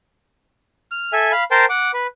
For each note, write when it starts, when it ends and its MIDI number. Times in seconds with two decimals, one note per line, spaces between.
0.92 1.13 89
1.13 1.32 69
1.13 1.32 76
1.13 1.32 80
1.32 1.44 77
1.32 1.44 83
1.51 1.65 70
1.51 1.65 72
1.51 1.65 79
1.51 1.65 81
1.51 1.65 84
1.69 1.91 78
1.69 1.91 86
1.94 2.07 71